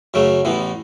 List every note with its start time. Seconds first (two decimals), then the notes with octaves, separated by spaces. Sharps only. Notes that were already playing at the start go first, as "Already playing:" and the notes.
0.14 F#2 C#3 F#3 A3
0.45 A1 A2 E3 B3